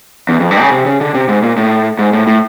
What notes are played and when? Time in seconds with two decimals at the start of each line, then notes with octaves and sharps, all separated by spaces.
0.29 E2
0.40 F2
0.51 G2
0.61 C#3
0.71 C3
0.86 C#3
1.01 D3
1.14 C3
1.29 G#2
1.42 A#2
1.57 A2
1.99 G#2
2.13 A2
2.27 A2